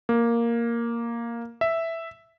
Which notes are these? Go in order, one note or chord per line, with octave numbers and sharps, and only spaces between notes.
A#3
E5